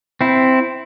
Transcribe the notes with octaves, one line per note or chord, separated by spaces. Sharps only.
C4 E4